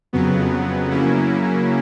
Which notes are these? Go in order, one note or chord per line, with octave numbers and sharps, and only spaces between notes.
F2 C#3 F#3 B3
C#3 F#3 A#3 C#4 E4